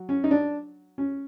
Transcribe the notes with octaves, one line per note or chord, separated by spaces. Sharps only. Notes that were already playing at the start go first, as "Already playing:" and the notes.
Already playing: F#3
C#4
D#4
D4
C#4